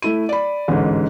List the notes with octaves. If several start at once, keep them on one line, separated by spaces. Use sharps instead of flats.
A3 E4 D#7
D5 B5
A1 D2 G#2